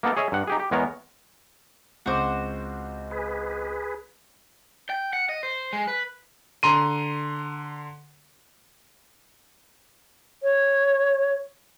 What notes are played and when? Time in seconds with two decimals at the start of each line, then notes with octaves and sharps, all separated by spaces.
0.03 A#3 B3 D#4 A4 A#4
0.17 G#4 C#5 D#5 E5
0.32 G2 F#5
0.47 D#4 G4 G#4
0.59 G4
0.71 E2 G#3 B3 A#4 C#5
2.06 C#2 C4 F#4 C5 D6
3.11 G#4 B4
4.90 G5
5.13 F#5
5.29 D#5
5.43 C5
5.73 G#3
5.88 B4
6.63 D3 A#5 C6 D#7
10.43 C#5